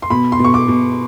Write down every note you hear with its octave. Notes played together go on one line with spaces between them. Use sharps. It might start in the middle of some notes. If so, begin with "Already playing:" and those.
C6
B2 B5
C6
B2
C#6
D6
B2